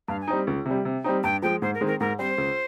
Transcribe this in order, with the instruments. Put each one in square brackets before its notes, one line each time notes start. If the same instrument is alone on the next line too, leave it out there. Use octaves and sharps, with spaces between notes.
[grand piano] G2 [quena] F5
[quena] G#5
[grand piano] G3 C4 D#4
C#2
C3
G3
C3
G3 C4 D#4
[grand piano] G2 [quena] G5
[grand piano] F3 G#3 [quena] G5
[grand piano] G#2 [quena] C5
[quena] A#4
[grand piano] D#3 G#3 C4
[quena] A#4
[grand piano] G#2 [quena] A#4
[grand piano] G3 C4 [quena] C5
[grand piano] C#2